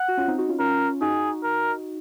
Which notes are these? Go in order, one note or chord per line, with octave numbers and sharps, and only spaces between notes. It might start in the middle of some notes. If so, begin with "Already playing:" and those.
Already playing: F#5
F#4
C#4 F4
C4 D#4
D#4 F#4
C#4 F4
C#4 F4 A#4
D#4 F#4 G#4
A#4